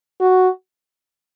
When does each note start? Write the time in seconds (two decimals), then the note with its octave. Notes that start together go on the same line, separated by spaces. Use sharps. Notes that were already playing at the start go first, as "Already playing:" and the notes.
0.21 F#4